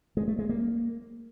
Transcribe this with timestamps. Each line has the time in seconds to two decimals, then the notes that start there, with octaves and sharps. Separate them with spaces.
0.17 G#3
0.28 A3
0.39 G#3
0.49 A#3